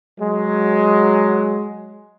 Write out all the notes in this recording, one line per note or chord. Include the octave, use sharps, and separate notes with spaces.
F#3 G#3